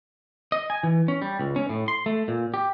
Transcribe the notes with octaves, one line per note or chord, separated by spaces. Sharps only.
D#5
G#5
E3
C#4
G3
C#2
C#4
A2
C6
A3
A#2
G4